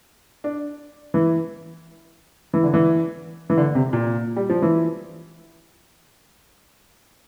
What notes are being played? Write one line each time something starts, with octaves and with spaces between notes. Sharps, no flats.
D4
E3
E3
D3
E3
E3
D3
C3
A#2
G3
F3
E3